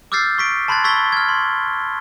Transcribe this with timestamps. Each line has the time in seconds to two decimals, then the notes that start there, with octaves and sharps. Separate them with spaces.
0.12 D6 E6 F6 G6 A6 C7
0.38 C#6 B6 D7
0.68 A5 B5 C6 F#6 G#6 A6
0.84 C#6 E6 G#6 A6 B6 G7
1.12 F6 G#6
1.29 C6